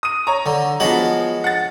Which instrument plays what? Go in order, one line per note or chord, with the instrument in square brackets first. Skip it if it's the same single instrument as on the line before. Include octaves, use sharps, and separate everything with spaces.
[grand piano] D#6 D#7
C#5 A#5
[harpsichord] D3 [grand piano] A#5
[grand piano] F3 B3 F#7 [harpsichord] G#3 F#4 C#5
[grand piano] F#5 A6